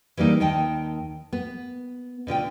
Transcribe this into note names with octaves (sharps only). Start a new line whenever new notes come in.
E3 G3 A#3 D#4
D#2 D#3 D#5 G5 A5
B3
B2 D3 F4 G5